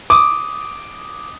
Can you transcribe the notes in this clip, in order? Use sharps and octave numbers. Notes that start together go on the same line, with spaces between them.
D6 D#6